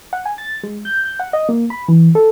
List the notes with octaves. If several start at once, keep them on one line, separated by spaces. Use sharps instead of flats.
F#5
G#5
A6
G#3
G6
G6
F#5
D#5
A#3
B5
E3
A4